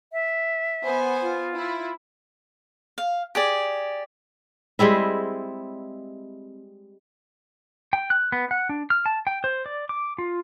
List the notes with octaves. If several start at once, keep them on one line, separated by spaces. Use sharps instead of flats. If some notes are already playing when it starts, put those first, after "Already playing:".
E5
B3 C5 G#5
F4
E4
F5
G4 G#4 D5
G3 G#3 C4 E4
G5
F#6
B3
F#5
D4
F6
A5
G5
C5
D5
D6
F4